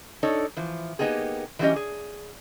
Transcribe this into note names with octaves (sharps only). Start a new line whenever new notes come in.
D4 D#4 A4 C#5
E3 F3
A#3 B3 D#4 G4 G#4
E3 F#3 G3 C#4 G4 D#5
G#4